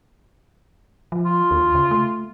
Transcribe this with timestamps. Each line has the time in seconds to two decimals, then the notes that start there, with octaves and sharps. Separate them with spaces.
1.12 F3
1.25 F4
1.51 D#2
1.75 C#3
1.91 A3